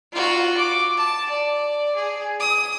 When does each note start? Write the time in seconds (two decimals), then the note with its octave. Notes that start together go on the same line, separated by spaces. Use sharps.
0.12 F4 F#4
0.57 D6
0.97 A5
1.29 D5
1.96 G#4
2.40 D#6